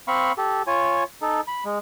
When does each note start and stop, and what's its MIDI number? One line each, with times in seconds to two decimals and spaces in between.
0.08 0.32 60
0.08 0.32 77
0.08 0.32 83
0.08 0.32 85
0.37 0.62 67
0.37 0.62 69
0.67 1.04 65
0.67 1.04 73
0.67 1.04 80
1.22 1.41 63
1.22 1.41 69
1.48 1.64 83
1.65 1.79 56